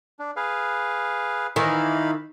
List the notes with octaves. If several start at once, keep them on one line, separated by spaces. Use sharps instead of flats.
D4
G#4 B4 F5
D#3 E3 D#4 F5 B5